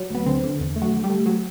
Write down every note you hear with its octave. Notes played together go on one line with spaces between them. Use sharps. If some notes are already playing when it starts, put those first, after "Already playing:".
Already playing: F#3
D2 B3
D3 C4
D3
E2
A3
F#3 F#4
D3
G3 G4
A3
F#3 F#4